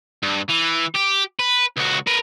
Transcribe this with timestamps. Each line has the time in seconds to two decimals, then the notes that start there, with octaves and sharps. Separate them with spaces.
0.23 G2
0.49 E3
0.95 G4
1.39 B4
1.77 C#2 F#4
2.07 A#4 B4